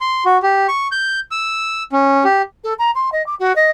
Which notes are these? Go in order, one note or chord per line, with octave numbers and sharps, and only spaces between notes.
C6
F#4
G4
C#6
G6
E6
C#4
G4
A4
A#5
C6
D#5
D6
F#4
D#5